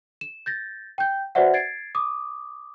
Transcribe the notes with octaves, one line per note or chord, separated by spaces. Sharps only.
E7
G6 A6 A#6
G5 G6
F#4 B4 C5 D5 E5 F#5
G#6 A6 C7 D7
D6 D#6